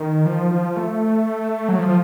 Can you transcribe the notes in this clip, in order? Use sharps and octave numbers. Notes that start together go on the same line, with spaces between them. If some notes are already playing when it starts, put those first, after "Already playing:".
Already playing: D#3
F3
F3
A3
F#3
F3
F3